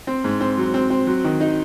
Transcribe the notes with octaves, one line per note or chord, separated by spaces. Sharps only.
C4
G#2
C4
F#3
C4
C4
F#3
D#3
D#4